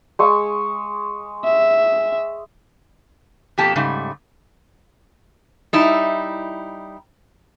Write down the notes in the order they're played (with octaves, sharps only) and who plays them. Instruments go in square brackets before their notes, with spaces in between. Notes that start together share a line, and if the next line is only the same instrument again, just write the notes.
[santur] G#3 C#6 E6
[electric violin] E5
[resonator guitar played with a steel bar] F2 B2 A#3 G4 A4 A5
G#2 C#3 G3 A3
G3 D#4 E4